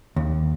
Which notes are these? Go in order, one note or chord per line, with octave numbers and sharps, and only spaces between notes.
D#2